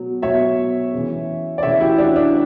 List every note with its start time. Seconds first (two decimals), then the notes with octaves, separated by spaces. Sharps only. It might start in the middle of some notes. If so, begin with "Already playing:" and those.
Already playing: B2 F#3
0.22 B2 F#3 C#5 E5
0.93 C#3 E3
1.58 D5
1.63 C#3 E3 C#5 E5
1.80 E4 G4
1.98 D4 F#4
2.16 D4